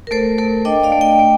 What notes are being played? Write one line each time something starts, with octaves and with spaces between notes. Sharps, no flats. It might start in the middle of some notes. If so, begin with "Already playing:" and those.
A#4
A3 A4 C5
A3 A4 C5
D4 D#5 G5
D5 F5
A3
D#5 G5
A3